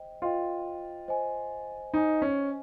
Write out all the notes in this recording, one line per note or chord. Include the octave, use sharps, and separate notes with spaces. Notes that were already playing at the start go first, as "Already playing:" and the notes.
Already playing: C5 D#5 G5
F4 C5 D#5 G5
C5 D#5 G#5
D#4 C5 D#5 G#5
C#4